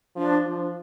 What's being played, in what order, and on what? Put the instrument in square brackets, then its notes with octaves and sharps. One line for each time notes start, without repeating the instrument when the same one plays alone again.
[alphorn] F3 [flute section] D4
[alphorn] F3